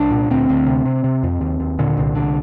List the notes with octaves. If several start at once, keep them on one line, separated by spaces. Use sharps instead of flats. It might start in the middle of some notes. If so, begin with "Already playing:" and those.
Already playing: C2 D4
A#2
D2 C4
D2
C3
C3
C3
F2
D#2
D#2
A#2 D3
C2
D3